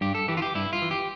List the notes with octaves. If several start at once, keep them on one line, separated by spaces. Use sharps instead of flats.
G2 G4
A4
E3 G4
F4
G4
G2 E4
F4
E3
G4